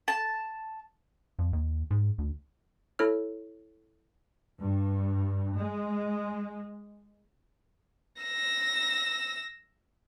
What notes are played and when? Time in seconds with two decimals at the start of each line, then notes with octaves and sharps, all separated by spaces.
0.08 A5
1.39 F2
1.53 D#2
1.91 G#2
2.18 D2
2.99 E4 A4 C#5 F6
4.62 G2
5.58 G#3
8.22 E6 A#6